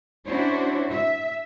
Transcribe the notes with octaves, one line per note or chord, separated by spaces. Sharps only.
C#4 D4 E4 F#4 C5 C#5
E5